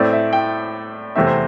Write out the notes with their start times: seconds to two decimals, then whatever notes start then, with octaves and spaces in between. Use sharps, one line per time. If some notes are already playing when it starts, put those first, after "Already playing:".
Already playing: A2 A3 C4 D5
0.13 E5
0.33 G5
1.16 E2 C3 A3 C4 E5
1.27 C5